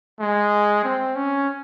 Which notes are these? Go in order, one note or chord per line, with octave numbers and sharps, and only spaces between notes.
G#3
C4
C#4